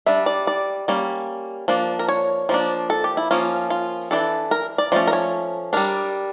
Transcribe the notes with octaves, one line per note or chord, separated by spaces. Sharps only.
G3 D4 E5
D5
D5
G3 A#3 C#4
F3 A#3 D4
A#4
C#5
F3 A#3 D4
A4
G4
E4
F3 A#3 C#4 F4
F4
E3 A3 D4 A4
A#4
D5
F3 A3 C#4 D5
A#4
C#5
G3 D4 A#4